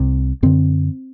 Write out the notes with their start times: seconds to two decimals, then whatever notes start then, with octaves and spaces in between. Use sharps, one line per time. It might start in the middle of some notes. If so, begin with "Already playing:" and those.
Already playing: C2 C3
0.43 F#2 D3 C4